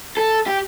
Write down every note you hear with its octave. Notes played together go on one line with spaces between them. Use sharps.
A4
G4